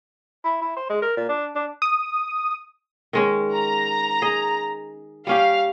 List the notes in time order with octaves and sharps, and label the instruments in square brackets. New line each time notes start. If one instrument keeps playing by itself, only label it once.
[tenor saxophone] E4
E4
C5
G#3
A#4
A#2
D4
D4
[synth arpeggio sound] D#6
[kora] D#3 G#3 C#4
[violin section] A#5
[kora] G#4 D#5
[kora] G3 C#4 G4 [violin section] F5